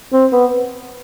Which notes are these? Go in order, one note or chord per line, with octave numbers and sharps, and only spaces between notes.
C4
B3